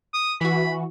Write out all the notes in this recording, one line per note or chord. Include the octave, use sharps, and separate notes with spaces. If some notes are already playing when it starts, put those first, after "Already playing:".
D#6
E3 F#4 B5